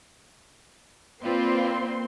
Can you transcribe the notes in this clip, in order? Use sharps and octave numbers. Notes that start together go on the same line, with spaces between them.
A#3 C4 F4 B4 D5 C6